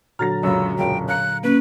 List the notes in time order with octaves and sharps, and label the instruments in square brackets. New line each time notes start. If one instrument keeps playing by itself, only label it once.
[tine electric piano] A#2 D3 F#3 [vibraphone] F#4 A#5 [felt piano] F6 A6 A#6
[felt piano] C#2 F#2 [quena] E6
[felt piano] E1 C#2 F#2 [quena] G5
[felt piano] F5 A#5 C#7 [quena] F#6
[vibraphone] A#3 C#4 [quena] B4